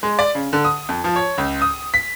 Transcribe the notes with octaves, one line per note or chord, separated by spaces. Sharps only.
G#3
D5
C#3
D3
D#6
F2
F3
C#5
C#2
D#6
B6